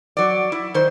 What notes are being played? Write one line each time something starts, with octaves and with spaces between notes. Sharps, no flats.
F#3 D5
E4
D#3 C5